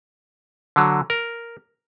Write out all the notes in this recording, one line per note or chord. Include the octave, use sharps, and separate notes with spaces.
D3 F#3
A#4